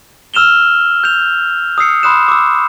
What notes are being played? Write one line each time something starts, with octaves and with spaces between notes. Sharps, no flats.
E6 F6 E7 F7 G7
G6 F7
D#6 E6 C7 C#7
B5 C6 D#6 F#6 E7
D6 E6